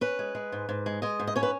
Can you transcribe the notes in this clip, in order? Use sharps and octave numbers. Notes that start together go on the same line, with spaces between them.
C#4 B4
G#3
G#3
G#2
G#2
G#3
G#3 D#5
G#2
D#5
C#4 C#5
B4